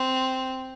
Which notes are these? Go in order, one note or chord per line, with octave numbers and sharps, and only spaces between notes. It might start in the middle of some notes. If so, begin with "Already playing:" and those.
Already playing: C4